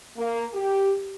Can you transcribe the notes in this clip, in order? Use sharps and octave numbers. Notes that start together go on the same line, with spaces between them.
A#3
G4